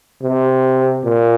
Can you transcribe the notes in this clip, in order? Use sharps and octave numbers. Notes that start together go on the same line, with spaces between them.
C3
A#2